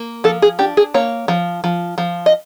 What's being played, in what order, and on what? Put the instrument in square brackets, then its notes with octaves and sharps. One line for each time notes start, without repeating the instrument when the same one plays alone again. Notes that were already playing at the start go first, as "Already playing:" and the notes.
Already playing: [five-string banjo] A#3
F3 A4
G#4
D4 G4
G#4
A#3 C#5
F3
F3
F3
D#5